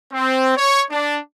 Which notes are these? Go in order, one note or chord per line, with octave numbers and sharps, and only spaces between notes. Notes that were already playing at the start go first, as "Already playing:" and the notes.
C4
C#5
D4